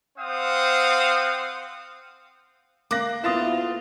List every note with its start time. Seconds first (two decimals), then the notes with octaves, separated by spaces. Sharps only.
0.18 C4 C5 F5 F#5 D#6
2.91 A#3 D6 F#6 A#6
3.24 D2 B3 E4 F4 D#6 A6 E7